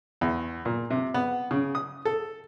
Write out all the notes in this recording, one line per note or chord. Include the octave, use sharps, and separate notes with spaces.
E2
A#2
C3
B3
C#3
D#6
A4